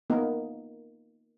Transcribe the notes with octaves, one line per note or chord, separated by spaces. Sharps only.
A#3 B3 D#4 A#4